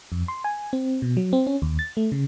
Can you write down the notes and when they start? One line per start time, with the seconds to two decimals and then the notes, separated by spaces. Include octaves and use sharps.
0.12 F2
0.28 C6
0.44 G#5
0.73 C4
1.02 B2
1.17 F#3
1.33 C4
1.47 C#4
1.62 D#2
1.79 A6
1.97 A3
2.12 C#3